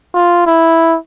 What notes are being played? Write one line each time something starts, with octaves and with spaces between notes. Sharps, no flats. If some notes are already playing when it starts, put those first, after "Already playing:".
F4
E4